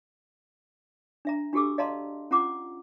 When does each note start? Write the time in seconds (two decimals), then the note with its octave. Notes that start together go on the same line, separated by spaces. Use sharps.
1.25 D4 E5 A#5
1.53 D4 F#4 G4 A4 D6 E6
1.78 D5 D#5 F5 A5 A#5 C6
2.31 C#4 F4 F#5 A#5 D6